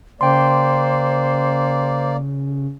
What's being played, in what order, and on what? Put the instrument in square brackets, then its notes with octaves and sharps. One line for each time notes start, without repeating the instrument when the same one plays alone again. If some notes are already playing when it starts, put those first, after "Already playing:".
[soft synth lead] C#3 [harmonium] A#3 D5 [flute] C5 [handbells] G5 C6